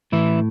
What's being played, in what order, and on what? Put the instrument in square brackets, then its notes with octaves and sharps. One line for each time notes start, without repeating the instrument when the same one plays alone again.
[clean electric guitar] A2 E3 E4